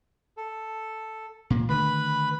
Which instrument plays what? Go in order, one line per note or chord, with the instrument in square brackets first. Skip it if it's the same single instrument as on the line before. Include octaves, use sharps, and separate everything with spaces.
[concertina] A4
[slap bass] A#2 A#3
[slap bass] D3 D#3 A3 [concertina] B4 B5